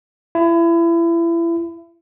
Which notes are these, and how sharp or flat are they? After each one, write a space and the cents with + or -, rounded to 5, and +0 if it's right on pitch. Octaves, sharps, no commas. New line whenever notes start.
E4 +30